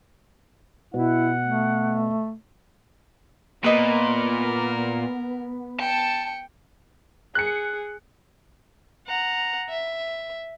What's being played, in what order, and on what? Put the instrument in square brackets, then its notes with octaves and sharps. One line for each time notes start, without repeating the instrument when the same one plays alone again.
[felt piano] B2 [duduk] E4 [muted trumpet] F#5
[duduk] A3
[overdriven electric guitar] A#2 [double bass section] B3 [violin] A#4 [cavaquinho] B4 D#5 B5
[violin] G5 C#7 [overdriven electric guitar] A5
[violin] G#4 [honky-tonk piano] F#6 C#7
[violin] F#5 A#5
E5